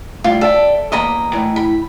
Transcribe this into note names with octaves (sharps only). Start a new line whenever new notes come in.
A2 C3 G3 F4
A4 D5 E5 G5
E2 A#3 D#5 A#5 B5
A2 E3
B5